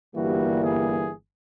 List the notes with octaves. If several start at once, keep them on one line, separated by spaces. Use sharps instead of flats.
G1 G2 E3 G3 A#3 F#4
G#4